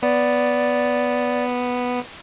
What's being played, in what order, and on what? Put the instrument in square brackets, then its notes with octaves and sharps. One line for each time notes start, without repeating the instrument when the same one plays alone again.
[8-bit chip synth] B3 [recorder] D5